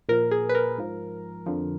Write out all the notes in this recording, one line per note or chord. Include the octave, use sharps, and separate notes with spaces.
A#2 F3 A#4
G#4
B4
A#4
G#2 F3
F2 D3 F3